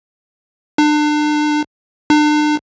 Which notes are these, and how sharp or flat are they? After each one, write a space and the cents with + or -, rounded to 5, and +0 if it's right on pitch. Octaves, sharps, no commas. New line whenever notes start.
D4 +35
D4 +40